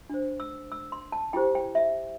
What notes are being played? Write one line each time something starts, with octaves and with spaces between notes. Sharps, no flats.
D4 C5
E6
E6
C6
A5
E4 G4 C5 G5
G5
E5